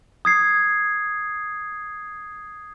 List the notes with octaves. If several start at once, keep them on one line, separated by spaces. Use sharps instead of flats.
D#6 G#6 C7